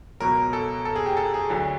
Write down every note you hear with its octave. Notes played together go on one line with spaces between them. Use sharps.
C#2 B2 F#3 A#4
A4
A4
G#4
G4
A4
G#4
D2 D3 F#3